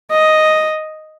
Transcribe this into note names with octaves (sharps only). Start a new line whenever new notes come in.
D#5